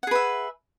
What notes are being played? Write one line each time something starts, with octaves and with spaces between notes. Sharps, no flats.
G#4 B4 E5 F#5